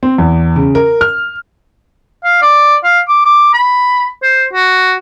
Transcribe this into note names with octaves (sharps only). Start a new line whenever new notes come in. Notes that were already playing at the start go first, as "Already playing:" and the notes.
C4
E2
C#3
A#4
F6
F5
D5
F5
D6
D6
B5
C5
F#4